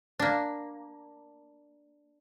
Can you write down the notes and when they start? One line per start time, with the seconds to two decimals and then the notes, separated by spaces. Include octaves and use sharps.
0.19 A#3 D4